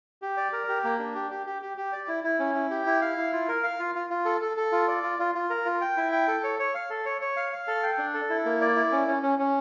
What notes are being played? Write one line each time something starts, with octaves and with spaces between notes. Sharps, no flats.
G4
D5
A#4
G4
A#3
D4
G4
G4
G4
G4
G4
D5
E4
E4
C#4
E4
G4
E4
F5
E4
F4
A#4
F5
F4
F4
F4
A4
A4
A4
F4
D5
F4
F4
F4
A#4
F4
G5
E4
G5
A4
C#5
C#5
F5
A4
C#5
C#5
F5
F5
A4
G5
D4
A4
E4
A#3
D5
E4
C#4
C#4
C#4
C#4